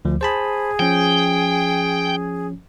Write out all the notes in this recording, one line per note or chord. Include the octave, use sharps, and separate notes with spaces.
D2 F3
G#4 C5 A5 B5
F3 C#4 G5